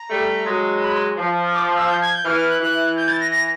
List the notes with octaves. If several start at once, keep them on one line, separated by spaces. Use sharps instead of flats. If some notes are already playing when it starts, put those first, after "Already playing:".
Already playing: A#5
G3 A3
F#3 G#3
B5
C6
F3
D6
E6
G6
G#6
G6
E3 F6
F6
F#6
E3 F#6
G6
A6
A#6
A#6